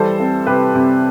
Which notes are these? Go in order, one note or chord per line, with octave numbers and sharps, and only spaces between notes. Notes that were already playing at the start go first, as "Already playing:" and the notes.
Already playing: E3 G3 A4 C5
C4
C3 G4 B4
C3